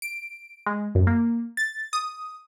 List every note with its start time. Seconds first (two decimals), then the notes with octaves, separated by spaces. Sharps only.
0.02 D7
0.66 G#3
0.95 F#2
1.07 A#3
1.57 A6
1.93 D#6